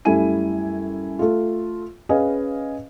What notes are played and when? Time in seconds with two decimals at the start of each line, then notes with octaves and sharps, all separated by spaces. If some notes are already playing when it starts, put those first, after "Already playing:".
0.05 F#2 G3 A3 E4 G#5 D#7
1.19 A3 F4
2.09 C#4 G#4 B4 D#5 F5 G#5